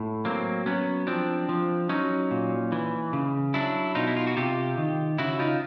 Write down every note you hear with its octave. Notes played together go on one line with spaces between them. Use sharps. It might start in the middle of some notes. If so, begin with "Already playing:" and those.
Already playing: A2
F#3 A#3 C4
F#3 B3 C#4
F3 C4 D4
F3
F#3 C#4 D#4
A#2
E3
C#3
F#3 D4 E4
B2 D#4 F4
E4
F4
F#4
C3 F4 G4
D#3
C#3 E4 F#4
D#4 F4